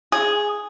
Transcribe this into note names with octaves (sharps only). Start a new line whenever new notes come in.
G#4